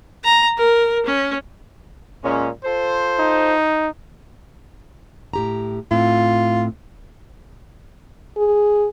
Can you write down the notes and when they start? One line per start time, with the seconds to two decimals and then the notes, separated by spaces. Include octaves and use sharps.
0.24 A#5
0.58 A#4
1.06 C#4
2.24 A#2 G#3 C#4
2.64 F4 A4 C5
3.19 D#4
5.33 A2 G4 A#5
5.91 A2 C4 F4
8.37 G#4